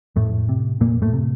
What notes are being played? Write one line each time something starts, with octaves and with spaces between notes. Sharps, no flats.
F2 A2 A3
C3
F2 A#2 A#3
A2 A3
C3